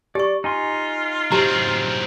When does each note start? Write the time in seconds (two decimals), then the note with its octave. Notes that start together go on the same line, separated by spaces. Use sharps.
0.15 G4 D5 C#6
0.44 D#4 F4 G#5 C6
1.32 F#3 C4 G4 A#5